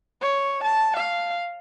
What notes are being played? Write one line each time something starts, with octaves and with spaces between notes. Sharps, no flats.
C#5
A5
F5